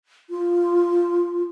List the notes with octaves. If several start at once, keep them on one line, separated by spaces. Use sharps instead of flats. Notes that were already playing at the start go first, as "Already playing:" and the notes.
F4